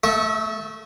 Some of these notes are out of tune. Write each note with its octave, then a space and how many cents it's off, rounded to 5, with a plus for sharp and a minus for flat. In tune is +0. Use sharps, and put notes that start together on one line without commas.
A3 +0 E5 -45 C#6 +0